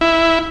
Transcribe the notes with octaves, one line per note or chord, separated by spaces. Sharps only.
E4